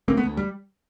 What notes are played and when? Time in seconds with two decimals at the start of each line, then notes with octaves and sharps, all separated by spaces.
0.08 D2 A#3 C4
0.17 A3 B3
0.23 D2
0.37 G3